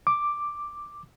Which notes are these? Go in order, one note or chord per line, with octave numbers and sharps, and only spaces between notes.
D6